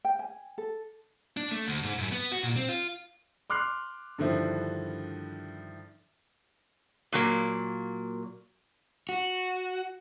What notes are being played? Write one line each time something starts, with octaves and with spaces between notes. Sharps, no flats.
G5
G#5
A4
D4
A3
D2
G#2
F#2
B3
F#4
A#2
C4
F4
C6 D6 F6 F#6 C7
G2 D3 D#3 F3 E4
A#2 F#3 A#3
F#4